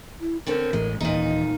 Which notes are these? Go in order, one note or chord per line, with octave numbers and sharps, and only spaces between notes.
E4
D3 C4 C#4 A#4
A1 A2 E3 G#3
D#1 A#2 E3 A#3 D#4 D#5